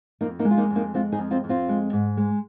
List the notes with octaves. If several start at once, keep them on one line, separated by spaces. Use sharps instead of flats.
F2 A#3 D#4
A#3 D#4
G#3
F4
A#3 D#4
F2
A#3 D#4
G#3 C4 F4
D#4 G#4
F2
C4 F4
F2
C4 F4
G#3
G#2
G#3